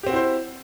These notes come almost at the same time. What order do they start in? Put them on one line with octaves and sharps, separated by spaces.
G4 C4 F#4 E4 C5